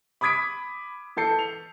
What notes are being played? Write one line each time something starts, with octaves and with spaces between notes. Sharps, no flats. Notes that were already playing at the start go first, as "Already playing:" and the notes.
B5 D6 D#6 G#6 B6 D7
E3 A4 A5 G6 C7 C#7
F7